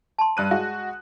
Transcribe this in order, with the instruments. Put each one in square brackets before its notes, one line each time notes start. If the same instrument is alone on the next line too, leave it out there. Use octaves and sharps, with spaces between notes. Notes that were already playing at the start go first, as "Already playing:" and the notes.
[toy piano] A5 C6
[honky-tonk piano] G2 F#6 D#7
G#3 F#4